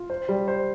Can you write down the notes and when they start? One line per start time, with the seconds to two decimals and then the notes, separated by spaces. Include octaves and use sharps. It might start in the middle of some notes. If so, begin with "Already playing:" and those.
Already playing: F4
0.10 C5
0.29 G3
0.48 C5